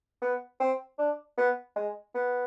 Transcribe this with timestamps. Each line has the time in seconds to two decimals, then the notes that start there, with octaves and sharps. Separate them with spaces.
0.22 B3
0.60 C4
0.98 D4
1.37 B3
1.76 G#3
2.15 B3